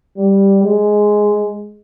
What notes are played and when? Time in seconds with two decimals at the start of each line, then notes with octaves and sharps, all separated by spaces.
0.18 G3
0.64 G#3